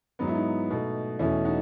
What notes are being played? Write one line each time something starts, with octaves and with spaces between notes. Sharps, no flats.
G#2 F#3 B3 D#4
E4
D#4
B2 A3
E2 B2 A3 C#4 E4
D#4 F#4